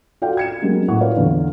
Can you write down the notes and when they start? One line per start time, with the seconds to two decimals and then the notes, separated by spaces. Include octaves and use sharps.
0.22 F4 F#4 A4 D5 F5 G5
0.37 G#6 C#7 E7
0.62 F#3 G#3 A#3 B3 C#4 G4
0.88 A2 F#5 C#6
1.01 F4 B4 C#5 D5 F5
1.14 E2 D3 F5